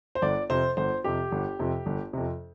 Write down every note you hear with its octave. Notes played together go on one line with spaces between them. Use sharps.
C5
G1 D5
F2 C3 C5
G1 C5
F2 C3 G4
G1
F2 C3
G1
F2 C3